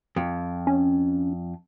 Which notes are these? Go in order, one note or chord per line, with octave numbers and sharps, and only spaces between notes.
F2
C#4